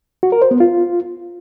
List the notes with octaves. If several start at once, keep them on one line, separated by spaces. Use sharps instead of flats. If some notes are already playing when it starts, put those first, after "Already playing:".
F#4
A#4
C5
B3
F4